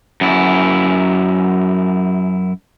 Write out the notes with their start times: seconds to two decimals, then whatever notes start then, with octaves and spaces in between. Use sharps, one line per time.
0.21 F#2 E4